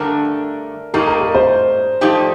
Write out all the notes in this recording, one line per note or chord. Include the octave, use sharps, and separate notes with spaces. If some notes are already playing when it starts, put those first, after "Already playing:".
Already playing: G2 D3 A3 D4 A#4
A2 G3 A#3 D#4 A#4
A#4
A#4
C5
F3 A3 D#4 G4 D5